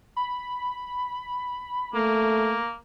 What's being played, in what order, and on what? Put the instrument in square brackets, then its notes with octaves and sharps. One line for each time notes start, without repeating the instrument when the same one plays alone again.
[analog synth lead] B5
[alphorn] A3 [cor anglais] A#3